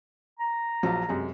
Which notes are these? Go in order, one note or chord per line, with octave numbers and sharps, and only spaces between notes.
A#5
A#1 F3 F#3
F#2 C3 G#3